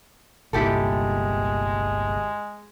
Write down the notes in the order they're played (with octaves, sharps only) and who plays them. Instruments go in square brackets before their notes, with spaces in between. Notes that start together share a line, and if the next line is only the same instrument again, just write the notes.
[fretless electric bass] G1 C2 A#2 [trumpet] G#3 [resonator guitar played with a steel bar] E4 G4 A4